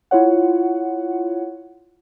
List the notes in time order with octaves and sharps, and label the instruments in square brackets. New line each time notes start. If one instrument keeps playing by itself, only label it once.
[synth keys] E4 F4 C#5 F#5